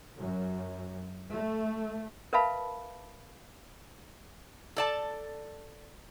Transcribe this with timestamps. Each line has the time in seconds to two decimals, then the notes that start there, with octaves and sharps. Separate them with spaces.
0.18 F#2
1.29 A3
2.33 A#4 B4 E5 F5 A5 B5
4.76 A4 D5 A5